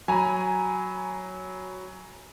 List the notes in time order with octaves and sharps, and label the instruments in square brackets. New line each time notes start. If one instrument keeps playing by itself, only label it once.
[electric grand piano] F#3 B5 [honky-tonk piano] G#5 A#5